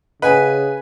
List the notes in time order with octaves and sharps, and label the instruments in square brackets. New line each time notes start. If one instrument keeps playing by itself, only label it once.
[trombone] C#3 [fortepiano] B4 G#5 [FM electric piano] D#5 F#5